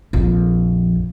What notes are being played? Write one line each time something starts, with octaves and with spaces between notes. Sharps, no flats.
A#1 F2